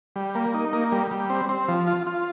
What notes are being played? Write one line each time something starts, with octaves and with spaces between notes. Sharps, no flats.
G3
A#3
D#4
A#3
G3
G3
C4
C4
F3
F4
F4